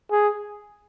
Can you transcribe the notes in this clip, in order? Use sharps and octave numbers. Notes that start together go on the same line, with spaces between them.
G#4